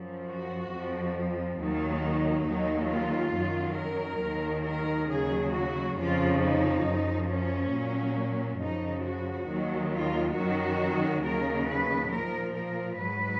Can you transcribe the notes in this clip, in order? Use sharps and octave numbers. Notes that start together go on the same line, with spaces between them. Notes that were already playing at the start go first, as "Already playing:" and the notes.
Already playing: F#2 F3
F#4
F2 F3
D#2 D#3 F#3 D#4
D#2 D#3 F#3 D#4
F4
F#2 D#3 F#3
A#4
D#2 D#3 F#3
A#4
D#2 C#3 F#3 G#4
F#4
F2 C#3 F3 F4
D#4
F#2 F3
C#4
A#2 F#3
F#2 C#3 F3 D#4
F#4
D#2 D#3 F#3
F4
F#2 D#3 F#3 F#4
D#2 C#3 F#3 A#4
B4
A#2 F3 A#4
A#4
G#2 F#3 B4